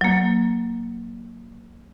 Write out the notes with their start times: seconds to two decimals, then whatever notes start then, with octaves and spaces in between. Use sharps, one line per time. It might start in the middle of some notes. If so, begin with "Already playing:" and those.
0.01 F#3 A#3